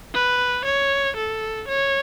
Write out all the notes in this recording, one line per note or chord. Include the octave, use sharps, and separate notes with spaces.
B4
C#5
A4
C#5